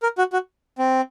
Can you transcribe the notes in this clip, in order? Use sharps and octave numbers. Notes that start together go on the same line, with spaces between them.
A#4
F#4
F#4
C4